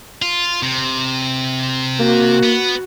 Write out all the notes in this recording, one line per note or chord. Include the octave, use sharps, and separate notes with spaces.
F4
C3
A#3 F#4
B3